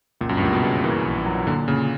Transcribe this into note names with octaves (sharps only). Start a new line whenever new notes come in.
C#2 A#2
F#2
G2
C#2 A#2
B2
C#3
E3 A#3
A#1
F#3
A#2 D3
A#2 C#3